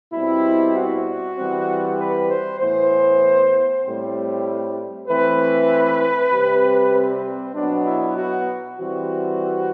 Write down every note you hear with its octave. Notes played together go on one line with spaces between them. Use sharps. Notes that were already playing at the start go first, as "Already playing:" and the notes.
B2 G3 C4 E4
F#4
E3 G3 C4
B4
C5
A2 E3 B3 C5
A2 G3 C4
E3 A3 C4 B4
C3 G3 C4
C4
B2 F#3 B3 D4
E4
F#4
E3 G3 C4 F#4